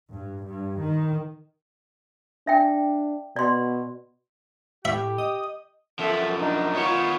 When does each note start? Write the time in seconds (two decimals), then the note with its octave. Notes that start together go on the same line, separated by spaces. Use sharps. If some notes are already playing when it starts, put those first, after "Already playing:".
0.12 G2
0.45 G2
0.82 D#3
2.47 D4 E5 G5
3.36 B2 D5 C6
4.85 A2 G4 E5
5.18 D#5 D#6
5.99 F#2 F3 A4 E5
6.40 D4 D#4
6.75 D#3 B3 F4 C#5